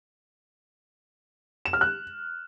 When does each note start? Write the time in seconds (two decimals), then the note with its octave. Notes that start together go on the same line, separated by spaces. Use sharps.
1.65 E7
1.73 F6
1.81 F#6